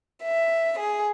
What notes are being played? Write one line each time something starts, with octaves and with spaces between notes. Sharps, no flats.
E5
G#4